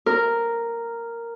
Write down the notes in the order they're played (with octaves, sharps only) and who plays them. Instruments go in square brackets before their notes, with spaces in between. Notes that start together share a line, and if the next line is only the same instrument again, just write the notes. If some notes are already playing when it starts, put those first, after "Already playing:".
[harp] A#4